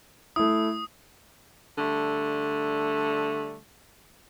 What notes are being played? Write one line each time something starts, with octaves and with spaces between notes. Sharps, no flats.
A3 E4 D#6
D3 G3 A3